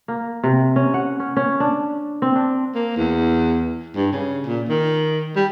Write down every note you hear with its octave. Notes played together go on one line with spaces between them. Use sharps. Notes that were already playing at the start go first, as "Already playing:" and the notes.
A#3
C3
C#4
F#5
C#4
C#4
D4
C4
D4
A#3
E2
G2
C#3
A#2
D#3
G3